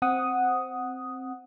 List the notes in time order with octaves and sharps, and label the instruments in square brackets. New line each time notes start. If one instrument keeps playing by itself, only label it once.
[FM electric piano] C4 F#5 D#6